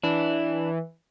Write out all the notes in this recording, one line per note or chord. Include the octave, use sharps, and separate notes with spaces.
E3 D4